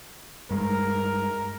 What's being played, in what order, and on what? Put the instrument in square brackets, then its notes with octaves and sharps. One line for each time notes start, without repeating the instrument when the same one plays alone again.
[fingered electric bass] G2 G#3 [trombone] A#4